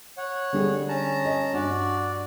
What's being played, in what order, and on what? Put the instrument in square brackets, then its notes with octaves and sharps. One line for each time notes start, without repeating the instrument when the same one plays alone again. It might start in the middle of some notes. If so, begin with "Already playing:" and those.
[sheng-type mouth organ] C#5 F#5
[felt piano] D3 G3 G#4
[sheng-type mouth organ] C#4 A5 A#5
[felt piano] D#5
[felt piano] G2 [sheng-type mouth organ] F#4 D5